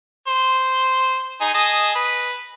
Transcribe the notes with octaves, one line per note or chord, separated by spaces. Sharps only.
C5
D#4 G#4
G#4 D#5 A5
B4